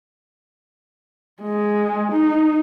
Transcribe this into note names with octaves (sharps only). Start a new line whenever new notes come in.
G#3
D#4